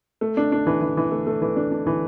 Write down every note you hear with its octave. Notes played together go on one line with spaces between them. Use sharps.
A3
D4
D4
E3
E3
E3
A3
A3
E3
D4
D4
E3